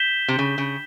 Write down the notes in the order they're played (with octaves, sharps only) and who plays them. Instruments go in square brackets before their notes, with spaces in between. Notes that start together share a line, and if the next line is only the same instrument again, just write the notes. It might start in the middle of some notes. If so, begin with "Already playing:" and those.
Already playing: [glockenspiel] G6 B6 E7 G7
[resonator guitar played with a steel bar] C3
C#3
C#3